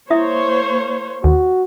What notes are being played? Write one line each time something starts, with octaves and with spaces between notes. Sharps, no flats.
A#3 E4 C5 C#5 E5 D#6
D#2 F#4